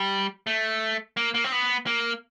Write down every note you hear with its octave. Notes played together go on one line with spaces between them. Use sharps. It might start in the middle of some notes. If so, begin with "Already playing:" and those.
Already playing: G3
A3
A#3
A#3
C4
B3
A#3